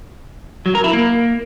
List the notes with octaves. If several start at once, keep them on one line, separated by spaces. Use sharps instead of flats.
F#3
A#4
E4
A#3